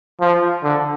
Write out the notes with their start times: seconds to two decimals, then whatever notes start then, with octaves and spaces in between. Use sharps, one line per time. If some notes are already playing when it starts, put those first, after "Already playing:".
0.20 F3
0.63 D3